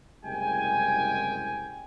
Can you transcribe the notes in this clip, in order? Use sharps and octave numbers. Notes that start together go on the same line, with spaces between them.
F#1 C2 G#3 G5 G#5